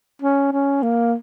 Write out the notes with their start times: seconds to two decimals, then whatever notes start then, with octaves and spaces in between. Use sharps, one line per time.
0.22 C#4
0.52 C#4
0.82 A#3